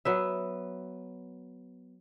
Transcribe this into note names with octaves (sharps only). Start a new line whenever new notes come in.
F#3 B3 E5